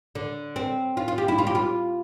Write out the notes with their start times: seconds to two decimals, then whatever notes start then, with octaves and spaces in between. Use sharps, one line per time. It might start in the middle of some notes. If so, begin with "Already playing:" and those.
0.15 D3
0.56 C4
0.97 F4
1.08 F4
1.18 G4
1.28 E4
1.38 F4
1.47 G4
1.55 F4